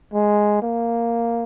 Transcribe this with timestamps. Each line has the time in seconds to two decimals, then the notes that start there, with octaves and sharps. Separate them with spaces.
0.13 G#3
0.62 A#3